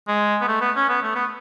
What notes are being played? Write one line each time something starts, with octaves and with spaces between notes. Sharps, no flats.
G#3
B3
A3
B3
C#4
B3
A3
B3